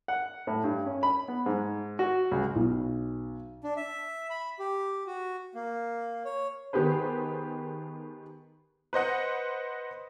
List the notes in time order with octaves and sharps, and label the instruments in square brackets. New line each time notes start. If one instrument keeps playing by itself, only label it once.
[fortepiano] F#5
A2
G2
C#4
B5
B3
G#2
F#4
C#2
[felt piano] B1
[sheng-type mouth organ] D4
E5
B5
G4
F#4
A#3
C#5
[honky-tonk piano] D#3 B3 G4 G#4 B4 C5
B4 C5 D#5 F#5